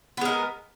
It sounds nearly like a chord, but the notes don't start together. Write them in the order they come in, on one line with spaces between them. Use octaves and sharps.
B3 G#3 A#4